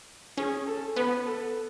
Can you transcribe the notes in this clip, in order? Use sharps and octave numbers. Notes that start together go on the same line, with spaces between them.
C#4 G#4
A4
B3 B4
A4